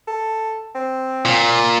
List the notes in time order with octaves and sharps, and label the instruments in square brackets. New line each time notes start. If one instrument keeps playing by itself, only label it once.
[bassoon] A4
C4
[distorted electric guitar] A#2